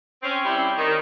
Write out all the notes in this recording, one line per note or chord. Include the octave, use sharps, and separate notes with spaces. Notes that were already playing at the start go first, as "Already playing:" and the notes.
C4 C#4
G3 C4 C#4 E4 G4 D5
D#3